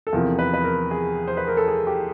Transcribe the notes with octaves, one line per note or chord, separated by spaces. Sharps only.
A4
E2 C3 F3 A#4
B4
B4
A#4
G#4
C5
B4
A#4
A4
G#4
G4